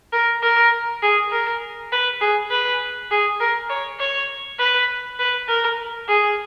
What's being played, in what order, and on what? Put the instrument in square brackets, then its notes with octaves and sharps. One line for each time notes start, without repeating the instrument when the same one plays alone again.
[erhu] A#4
A#4
G#4
A#4
B4
G#4
B4
G#4
A#4
C#5
C#5
B4
B4
A#4
G#4